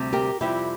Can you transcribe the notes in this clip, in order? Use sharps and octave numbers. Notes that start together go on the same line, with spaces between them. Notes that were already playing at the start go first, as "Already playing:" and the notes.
Already playing: D2 C3 G3
G4 A#4
F2 C3 G3 E4 G4